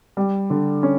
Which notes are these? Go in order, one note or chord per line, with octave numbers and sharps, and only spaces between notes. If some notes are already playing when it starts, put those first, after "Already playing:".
G3
D3
C#4